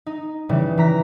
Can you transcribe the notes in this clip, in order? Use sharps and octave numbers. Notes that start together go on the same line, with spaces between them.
D#4
C#3 E3 G3
E3 A#5 B6